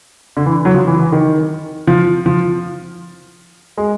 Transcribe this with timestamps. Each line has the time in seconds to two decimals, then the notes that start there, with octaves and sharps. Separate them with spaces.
0.37 D3
0.46 E3
0.65 F#3
0.74 F3
0.87 E3
0.99 E3
1.12 D#3
1.87 F3
2.26 F3
3.77 G#3